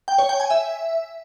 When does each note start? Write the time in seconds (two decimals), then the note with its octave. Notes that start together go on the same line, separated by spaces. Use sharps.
0.08 G5
0.18 C#5
0.29 G5
0.40 G#5
0.50 E5